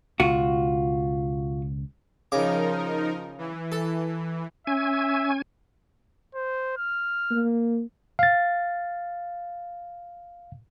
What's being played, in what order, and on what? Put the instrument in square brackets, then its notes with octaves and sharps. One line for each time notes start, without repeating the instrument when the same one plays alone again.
[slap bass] C#2 B2 [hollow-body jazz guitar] F4 F#4
[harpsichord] C#3 D6 [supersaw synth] F3 D#4 A#4
[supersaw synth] E3
[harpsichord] A4
[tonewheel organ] C#4 G#5 [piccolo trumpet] E5
[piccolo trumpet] C5
F6
[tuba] A#3
[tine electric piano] F5 A6